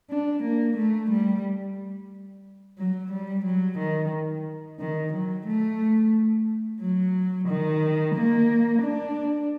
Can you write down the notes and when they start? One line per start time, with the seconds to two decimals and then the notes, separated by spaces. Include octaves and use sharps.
0.10 D4
0.43 A#3
0.76 A3
1.10 G3
2.78 F#3
3.11 G3
3.45 F#3
3.79 D#3
4.79 D#3
5.12 F#3
5.47 A3
6.81 F#3
7.48 D#3
8.15 A#3
8.82 D4